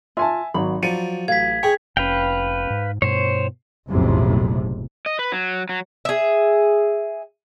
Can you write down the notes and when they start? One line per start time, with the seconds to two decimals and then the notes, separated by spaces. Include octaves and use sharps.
0.17 F4 E5 G#5 A5
0.54 G#1 F#3 B5
0.83 F3 F#3 D5 C#7 D#7
1.28 A1 F5 G#6 B6
1.63 G#4 C#5 G5
1.97 F1 C#4 B4 F5 G5
2.70 G#2
3.02 G2 B2 C5 C#5
3.91 F#1 B1 F2 A2 C3
5.06 D#5
5.19 B4
5.32 F#3
5.69 F#3
6.05 G#4 E5